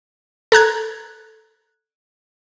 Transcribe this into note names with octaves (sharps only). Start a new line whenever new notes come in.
A4 A#5 F#6 G#6